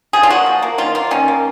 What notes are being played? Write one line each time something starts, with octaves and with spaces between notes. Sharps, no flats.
F3 G#4
F4
A#3 F#4
F3
A#3
D#3 F4
A#3 F4
D#3 C#4
A#3